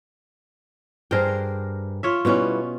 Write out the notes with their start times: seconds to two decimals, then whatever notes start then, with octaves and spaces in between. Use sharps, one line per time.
1.11 G2 G#4 A#4 C5 G5
2.03 F4 C#5 E5
2.25 B2 G3 B3 C#4 E4